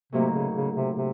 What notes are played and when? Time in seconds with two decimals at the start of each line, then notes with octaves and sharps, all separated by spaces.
0.12 A2 C3 F#3 A#3 D#4
0.34 C#3
0.54 C#3
0.75 C3
0.96 C3